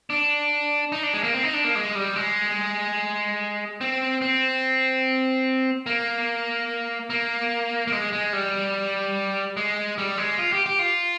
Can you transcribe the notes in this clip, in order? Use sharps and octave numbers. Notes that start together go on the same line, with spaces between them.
D4
D#4
D4
G#3
A#3
C4
D#4
D4
A#3
G#3
G3
G#3
C4
C4
A#3
A#3
A#3
G#3
G#3
G3
G#3
G3
G#3
F4
G4
G4
F4